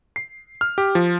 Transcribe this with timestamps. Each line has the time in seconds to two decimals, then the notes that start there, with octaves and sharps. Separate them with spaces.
0.16 C7
0.61 F6
0.78 G4
0.95 F3